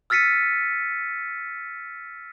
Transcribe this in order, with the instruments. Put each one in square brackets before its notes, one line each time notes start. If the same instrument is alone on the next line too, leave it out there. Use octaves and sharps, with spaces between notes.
[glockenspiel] E6 F6 A6 B6 C#7 D#7